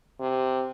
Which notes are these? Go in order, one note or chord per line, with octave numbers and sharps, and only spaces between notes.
C3